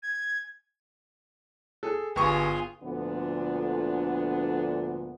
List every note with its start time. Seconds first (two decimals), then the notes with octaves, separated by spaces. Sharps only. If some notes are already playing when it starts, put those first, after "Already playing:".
0.03 G#6
1.83 G#4 A4
2.16 G1 F4 G#4 C#6
2.82 D2 A#2 D3 F3 B3 D4